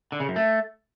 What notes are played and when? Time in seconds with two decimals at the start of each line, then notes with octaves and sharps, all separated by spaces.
0.12 D3
0.20 C#3
0.28 F#2
0.36 A3